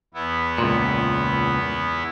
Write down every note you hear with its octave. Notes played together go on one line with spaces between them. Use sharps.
E2 B3 E4
C#2 A#2